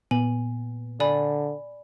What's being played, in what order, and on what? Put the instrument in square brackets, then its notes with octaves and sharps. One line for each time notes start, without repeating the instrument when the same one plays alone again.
[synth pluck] A#2 B3 [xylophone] G#5 F#7
[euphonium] D3 [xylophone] D5 G#5 B5